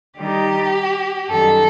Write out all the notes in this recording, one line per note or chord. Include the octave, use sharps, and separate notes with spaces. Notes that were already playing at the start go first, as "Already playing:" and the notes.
D#3 G3 D#4 G4
F#2 D#3 G3 A4